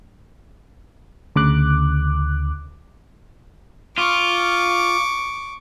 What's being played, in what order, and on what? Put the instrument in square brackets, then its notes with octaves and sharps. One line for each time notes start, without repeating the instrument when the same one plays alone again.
[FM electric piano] D2 C#3 D6 F#6
[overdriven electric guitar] F4 [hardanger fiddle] C#6 D6